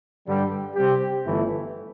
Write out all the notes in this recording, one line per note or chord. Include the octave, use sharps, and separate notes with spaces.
G2 D3 G3
C3 G3 C4 G4
G1 G2 E3 A3